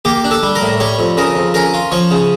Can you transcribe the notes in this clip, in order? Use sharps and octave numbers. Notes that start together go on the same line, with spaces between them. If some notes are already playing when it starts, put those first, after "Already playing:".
A#3 G4
D4
A4
G3
A#4
A2
G3 C#5
F2
C#3 A#4
F2
C#4 A#4
F4
F3 C#5
C#3